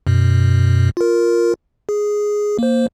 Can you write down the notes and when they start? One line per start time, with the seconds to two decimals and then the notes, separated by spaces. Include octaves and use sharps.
0.07 F#2 B2
0.97 F4 A#4
1.89 G#4
2.59 A#3 C5